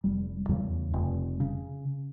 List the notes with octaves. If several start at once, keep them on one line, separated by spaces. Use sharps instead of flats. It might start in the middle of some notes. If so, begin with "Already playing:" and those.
F1 G3
E2 C#3 G3
F1
C#3